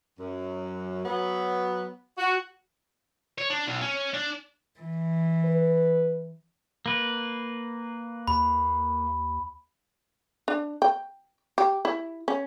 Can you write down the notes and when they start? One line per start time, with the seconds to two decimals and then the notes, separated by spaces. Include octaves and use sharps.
0.19 F#2
1.04 F#3 B3
2.17 F#4
3.38 C#5
3.50 D4
3.67 B1
3.81 C#4
4.14 D4
4.79 E3
5.45 B4
6.86 A#3 B4
8.28 D#2 B5
10.48 D4
10.82 G5
11.58 G4
11.85 E4
12.28 C#4